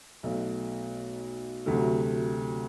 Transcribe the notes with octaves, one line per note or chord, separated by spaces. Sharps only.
B1 B2 A3
D2 C3 F#3 A3